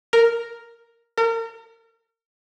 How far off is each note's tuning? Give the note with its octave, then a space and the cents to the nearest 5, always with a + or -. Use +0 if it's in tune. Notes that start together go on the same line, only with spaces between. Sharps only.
A#4 +0
A#4 -35